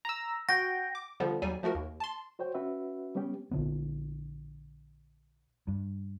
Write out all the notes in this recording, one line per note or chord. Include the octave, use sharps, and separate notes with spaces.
A#5 E6
F#4 G5 A#6
D6
D3 F3 G3 B3
D#2 F#3 G3 G#5
F3 A3 F#4 A#4
D#2
A5 C6
F#4 C5 C#5 G5
C#4 F#4 B4 E5
G3 B3 C#4 G4
A#1 D3 B3
G2